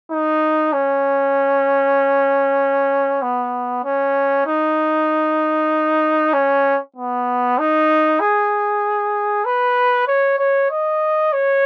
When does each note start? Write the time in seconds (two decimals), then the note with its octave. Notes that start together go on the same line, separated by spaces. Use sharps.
0.10 D#4
0.73 C#4
3.22 B3
3.85 C#4
4.46 D#4
6.33 C#4
6.96 B3
7.58 D#4
8.20 G#4
9.45 B4
10.07 C#5
10.39 C#5
10.70 D#5
11.33 C#5